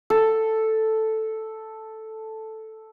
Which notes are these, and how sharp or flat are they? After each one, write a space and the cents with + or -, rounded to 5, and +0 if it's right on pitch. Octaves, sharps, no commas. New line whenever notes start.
A4 +0